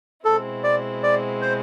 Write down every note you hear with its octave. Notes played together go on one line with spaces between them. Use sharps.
B2 G#3 C4 E4 A4
D5
D5
C5